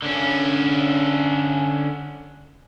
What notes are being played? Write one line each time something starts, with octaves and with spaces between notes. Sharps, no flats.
D3 C#4